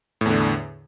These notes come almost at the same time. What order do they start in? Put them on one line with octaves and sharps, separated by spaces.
A2 E2 D3